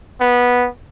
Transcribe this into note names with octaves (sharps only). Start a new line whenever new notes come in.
B3